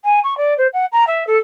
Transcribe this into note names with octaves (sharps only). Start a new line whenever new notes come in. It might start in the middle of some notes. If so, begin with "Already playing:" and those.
G#5
C#6
D5
C5
F#5
A#5
E5
A4